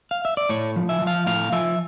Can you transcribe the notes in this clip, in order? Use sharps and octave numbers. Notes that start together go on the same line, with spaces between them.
F5
E5
D5
A2 C#5
F3
E5
F3
F5
A2 F5
F3 E5